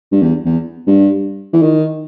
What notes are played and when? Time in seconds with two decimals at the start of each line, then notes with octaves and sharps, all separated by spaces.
0.12 G2
0.22 E2
0.45 E2
0.87 G2
1.53 E3
1.62 D#3